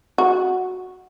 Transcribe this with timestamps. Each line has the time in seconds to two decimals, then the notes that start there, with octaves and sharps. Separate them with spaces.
0.18 F#4